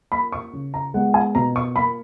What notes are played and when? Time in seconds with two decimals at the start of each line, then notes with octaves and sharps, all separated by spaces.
0.12 A#3 B5
0.32 C#6
0.53 C#3
0.74 A#5
0.94 G#3 B3 F#5
1.14 G#5
1.35 B2 A#5
1.56 C#6
1.76 A#3 B5